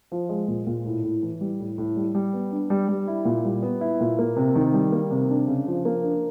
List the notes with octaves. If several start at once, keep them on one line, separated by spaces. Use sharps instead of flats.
F3
G#3
A#2
A#2
A2
A2
E3
G3
A2
A2
G3
G3
B3
D4
G3
G3
E4
A#2
G3
B3
E4
A#2
A#3
C3
D#3
G3
A#3
C3
D4
C#3
F3
A#3
D4